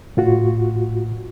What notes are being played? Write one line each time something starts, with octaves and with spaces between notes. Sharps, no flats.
A2 F4 F#4